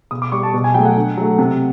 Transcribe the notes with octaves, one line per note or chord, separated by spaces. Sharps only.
B2 D#6
D6
G3 C#6
A5
B2
G#5
F#3 A3 G5
F#5
D3
F#3 A3
C3